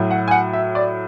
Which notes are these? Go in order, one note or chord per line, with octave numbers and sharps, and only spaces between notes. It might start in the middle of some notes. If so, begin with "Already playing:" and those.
Already playing: A2 F#3
F#5
G#5
F#5
E5
D5